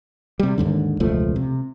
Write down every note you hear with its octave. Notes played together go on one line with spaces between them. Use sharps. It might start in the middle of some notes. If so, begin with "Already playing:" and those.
C3 G3
D#2 G#2 D3
E1 C#2 F3 A3
C3